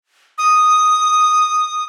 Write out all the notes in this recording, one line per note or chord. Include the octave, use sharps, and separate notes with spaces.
D#6